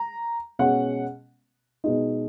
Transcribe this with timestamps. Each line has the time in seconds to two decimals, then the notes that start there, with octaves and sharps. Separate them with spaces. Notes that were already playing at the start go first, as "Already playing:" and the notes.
Already playing: A#5
0.59 B2 G#3 C#4 F#5
1.84 B2 G#3 D#4